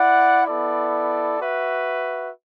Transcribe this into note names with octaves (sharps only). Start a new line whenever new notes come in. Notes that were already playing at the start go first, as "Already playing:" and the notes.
Already playing: E4 D5 F#5
B3 E4 A4 D5
F#4 B4 E5